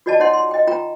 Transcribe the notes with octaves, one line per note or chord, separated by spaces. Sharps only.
F4 F#4 D5 D#5 A5
D#4 C#5 D#5 F#5 C6
C6
D#5 G5
F4 G5 A#5